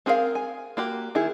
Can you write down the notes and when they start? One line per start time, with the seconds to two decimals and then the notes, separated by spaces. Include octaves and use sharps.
0.06 C4 G#4 A#4 D5 F5
0.35 G#5
0.77 A#3 F#4 G4
1.15 D#3 E4 G#4